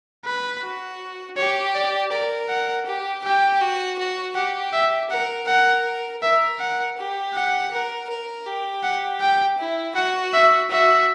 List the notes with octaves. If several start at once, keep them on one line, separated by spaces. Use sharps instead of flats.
B4
F#4
G4 C#5
D5
A#4 D5
F#5
G4
G4 G5
F#4
F#4
G4 F#5
E5
A#4 F#5
A#4 F#5
A#4 E5
F#5
G4
F#5
A#4
A#4
G4
F#5
G5
E4
F#4 F#5
E5
F#4 E5